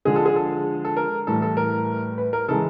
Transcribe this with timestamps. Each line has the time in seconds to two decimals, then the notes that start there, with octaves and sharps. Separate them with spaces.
0.05 D3 F3 G#3 G#4
0.16 A4
0.26 G#4
0.36 A4
0.85 A4
0.97 A#4
1.27 A2 E3 G3 A4
1.42 A4
1.57 A#4
2.18 B4
2.33 A#4
2.48 C#3 E3 G#3 A4